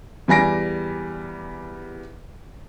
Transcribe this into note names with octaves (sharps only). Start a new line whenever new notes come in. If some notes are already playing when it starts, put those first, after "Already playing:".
E2 G3 G#5 A#6 D7